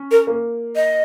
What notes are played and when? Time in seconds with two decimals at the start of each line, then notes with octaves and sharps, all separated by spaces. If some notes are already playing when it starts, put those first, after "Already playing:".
Already playing: C#4
0.11 A#4
0.27 A#3
0.76 D#5